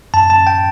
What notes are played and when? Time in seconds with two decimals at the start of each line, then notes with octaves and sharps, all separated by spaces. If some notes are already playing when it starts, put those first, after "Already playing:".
0.14 F#2 A5
0.30 F#2 A5
0.47 G5